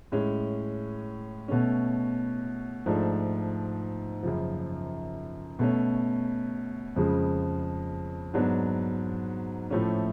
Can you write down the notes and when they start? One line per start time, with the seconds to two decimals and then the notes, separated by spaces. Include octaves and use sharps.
0.12 A2 G#3 C#4
1.48 B2 A3 C#4
2.86 G#2 F3 A3 D4
4.23 F#2 C#3 F3
5.59 B2 A3 C#4
6.96 F2 C#3 F3 G#3
8.34 G#2 F#3 B3 D4
9.71 A2 F3 A3 C#4